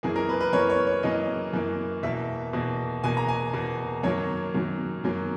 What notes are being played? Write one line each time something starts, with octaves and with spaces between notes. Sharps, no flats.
F#2 E3 A#3 G#4
A#4
B4
B4
F#2 E3 A#3 C#5
C#5
C#5
F#2 E3 A#3 D#5
F#2 E3 A#3
E2 B2 A#3 E5
E2 B2 A#3
E2 B2 A#3 G#5
A#5
G#5
E2 B2 A#3
F#2 D#3 F#3 A#3 C#5
F#2 D#3 F#3 A#3
F#2 D#3 F#3 A#3